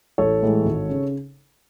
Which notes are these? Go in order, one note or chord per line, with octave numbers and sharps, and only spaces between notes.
A1 A4 C#5
A2 E3 G#3
G#1
C#3